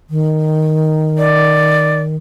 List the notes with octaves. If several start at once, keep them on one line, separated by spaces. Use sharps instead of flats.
D#3
D5